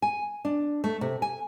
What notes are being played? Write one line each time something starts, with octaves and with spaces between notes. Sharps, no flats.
G#5
D4
A3
C3
G#5